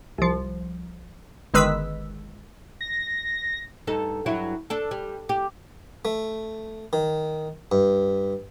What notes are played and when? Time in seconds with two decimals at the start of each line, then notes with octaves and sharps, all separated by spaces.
0.18 C2 F3
1.54 G1 D#3 G#3 B4 E6 B6
2.81 A#6
3.87 G2 D#4 A4
4.26 G2 F#3 E4
4.70 D4 A4
4.91 G3
5.29 G4
6.05 A3
6.93 D#3
7.72 G2